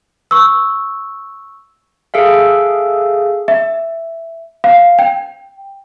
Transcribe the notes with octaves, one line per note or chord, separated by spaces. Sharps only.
C#6 E6
G#4 A4 E5 F5
E5
F5
G5